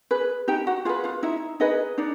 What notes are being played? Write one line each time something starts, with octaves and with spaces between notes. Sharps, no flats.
G#4 B4
D#4 G4 G5
F#4 F#5
F4 G#4 B4 F5
F4 F5
D#4 E4 E5
D#4 G#4 B4 D#5
D4 D#4 D5